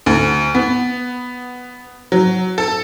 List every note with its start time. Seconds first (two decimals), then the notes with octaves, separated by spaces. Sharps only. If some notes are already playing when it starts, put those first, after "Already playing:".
0.06 D2
0.55 B3
2.12 F#3
2.58 A4